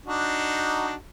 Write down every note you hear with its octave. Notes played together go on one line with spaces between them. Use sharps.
D4 D#4 F#4